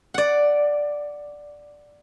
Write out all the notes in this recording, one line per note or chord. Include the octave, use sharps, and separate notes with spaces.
D5 F#5